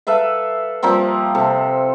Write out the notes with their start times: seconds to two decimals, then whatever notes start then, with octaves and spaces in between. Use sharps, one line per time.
0.07 A4 B4 E5 F5
0.83 F3 G3 A#3 C4
1.35 C3 A4